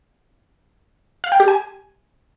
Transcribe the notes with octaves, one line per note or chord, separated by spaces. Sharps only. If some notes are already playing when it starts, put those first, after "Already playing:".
F5
G5
G4
G#5